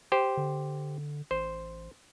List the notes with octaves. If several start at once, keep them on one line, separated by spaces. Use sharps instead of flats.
G4 C5
D3
A1 C5